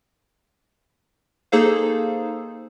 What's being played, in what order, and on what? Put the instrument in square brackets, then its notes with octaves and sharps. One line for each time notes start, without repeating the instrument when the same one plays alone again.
[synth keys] A#3 D#4 G#4 A4 C5 F5